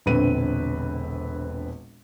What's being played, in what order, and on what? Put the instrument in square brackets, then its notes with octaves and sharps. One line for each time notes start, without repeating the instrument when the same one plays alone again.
[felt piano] E1 A#1 D3 C4 B4 D#7